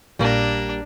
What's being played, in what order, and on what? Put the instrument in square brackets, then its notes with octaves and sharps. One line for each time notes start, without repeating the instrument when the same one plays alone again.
[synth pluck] A#1 A#2 A#6 [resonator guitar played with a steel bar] G3 A#3 [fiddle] D4